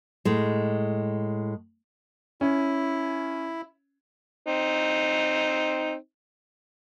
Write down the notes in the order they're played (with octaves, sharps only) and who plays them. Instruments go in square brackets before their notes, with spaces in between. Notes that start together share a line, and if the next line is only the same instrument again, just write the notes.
[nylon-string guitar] A2 G#3
[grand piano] C#4 [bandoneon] E4
[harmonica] C4 D#4